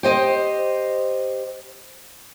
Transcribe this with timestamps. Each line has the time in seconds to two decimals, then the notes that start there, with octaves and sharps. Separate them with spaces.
0.03 G4 C5 D#5